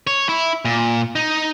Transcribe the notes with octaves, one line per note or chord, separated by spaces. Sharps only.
C#5
E4
A#2
D#4